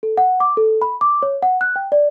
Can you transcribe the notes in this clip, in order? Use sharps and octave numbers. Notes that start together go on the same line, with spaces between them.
A4
F#5
D6
A4
B5
D6
C#5
F#5
F#6
G5
D5